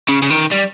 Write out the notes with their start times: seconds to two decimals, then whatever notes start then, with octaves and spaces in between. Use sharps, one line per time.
0.09 C#3
0.22 C#3
0.31 D#3
0.52 G3